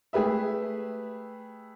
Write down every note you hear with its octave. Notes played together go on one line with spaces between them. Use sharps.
A3 G4 G#4 B4 E5